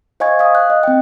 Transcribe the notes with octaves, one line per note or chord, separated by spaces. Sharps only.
C5 D#5 F5 G#5 C#6 G#6
F5 D#6
F#6
D#5
C4 G5